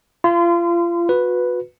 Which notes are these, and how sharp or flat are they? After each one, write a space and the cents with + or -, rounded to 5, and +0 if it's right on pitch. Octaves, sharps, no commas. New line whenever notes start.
F4 -30 C6 -40
F#4 -35 B4 +0